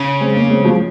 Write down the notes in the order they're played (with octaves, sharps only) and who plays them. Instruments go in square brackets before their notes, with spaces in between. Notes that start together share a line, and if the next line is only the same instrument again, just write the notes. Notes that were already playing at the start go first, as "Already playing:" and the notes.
Already playing: [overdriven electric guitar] C#3
[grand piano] G#3 C4
A#3 C#4
G#3 C4
F3 G#3